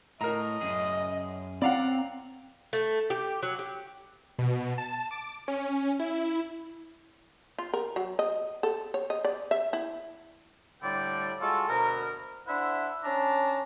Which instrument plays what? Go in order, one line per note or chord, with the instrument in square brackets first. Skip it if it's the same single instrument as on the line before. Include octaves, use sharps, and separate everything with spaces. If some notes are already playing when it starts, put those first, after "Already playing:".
[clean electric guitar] A2 [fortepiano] A#4 A#5 [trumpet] D#5
[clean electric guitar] F#2 G#4
[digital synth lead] C4 [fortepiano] D5 F5 F#5 [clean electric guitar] A#5 B5
[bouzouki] A3
G4
F#3
G4
[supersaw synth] B2
A5
D6
C#4
E4
[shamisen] F4
A#4
F#3
D#5
A4
C#5
D#5
D5
E5
E4
[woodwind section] A2 D3 G3 D5 G5
G#3 F4 F#4 A4
D2 B2 A#4
D4 E4 C5 E5 F#5
C#4 D4 A5 A#5